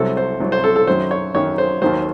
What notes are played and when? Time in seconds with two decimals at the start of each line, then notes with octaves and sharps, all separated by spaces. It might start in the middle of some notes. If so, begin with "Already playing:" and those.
Already playing: C2 C3 F#3 A4
0.17 C5
0.40 C2 C3 F#3
0.52 C5
0.64 A4
0.76 A4
0.87 F#2 D#3 F#3 C5
1.11 C#5
1.35 F#2 D#3 F#3 C#5
1.58 C5
1.82 D#2 D#3 F#3 C5